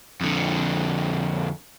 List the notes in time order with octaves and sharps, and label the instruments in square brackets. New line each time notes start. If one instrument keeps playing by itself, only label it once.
[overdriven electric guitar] F2 D3